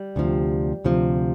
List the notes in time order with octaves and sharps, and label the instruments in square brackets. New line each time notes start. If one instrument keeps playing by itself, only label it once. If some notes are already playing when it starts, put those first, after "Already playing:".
Already playing: [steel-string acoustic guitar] G3
D2 C3 F3
D2 C3 F3